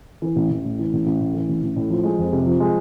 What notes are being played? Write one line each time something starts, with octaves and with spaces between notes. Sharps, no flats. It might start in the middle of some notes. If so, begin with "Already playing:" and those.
E3
A1
A1
A2
E3
A1
A1
A2
E3
A1
A1
A2
F3
G#3
F2
C3
F3
G#3